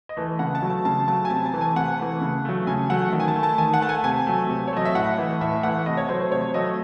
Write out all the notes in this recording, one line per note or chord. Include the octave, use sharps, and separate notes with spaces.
D#5
E3 A3
C#3 F#5
A5
F#3 A3
A5
C#3 A5
F#3 A3 A5
G#5
C3 A5
A5
E3 A3
G#5
C3 F#5
E3 A3
C#3
F#3 A3
C#3 G#5
F#3 A3 F#5
D#3
G#5
A5
A3
A5
D#3 G#5
F#5
A3 A5
G#5
C3 G#5
F#3 A3
C3
C#5
F#3 A3 D#5
E5
A2 F#5
E3 A3
A2 E5
E3 A3 F#5
C3 D#5
C#5
F#3 A3 C5
C5
C3 C#5
F#3 A3 D#5